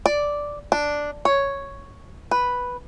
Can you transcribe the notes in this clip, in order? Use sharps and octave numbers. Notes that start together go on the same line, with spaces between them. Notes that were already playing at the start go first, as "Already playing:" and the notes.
D5
D4
C#5
B4